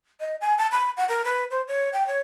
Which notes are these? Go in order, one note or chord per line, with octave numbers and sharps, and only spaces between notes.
D#5
G#5
A5
B5
F#5
A#4
B4
C5
C#5
G5
C#5